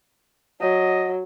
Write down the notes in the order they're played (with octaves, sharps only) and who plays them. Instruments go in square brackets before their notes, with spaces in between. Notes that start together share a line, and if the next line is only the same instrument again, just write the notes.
[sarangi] F#3 [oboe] D#5